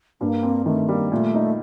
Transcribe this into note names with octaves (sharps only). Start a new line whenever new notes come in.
G2 A#3
C4
D#3 A3
G3 A#3
A#2 A3
D#4